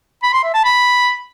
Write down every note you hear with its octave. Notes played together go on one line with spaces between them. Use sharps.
B5
C6
E5
A5
B5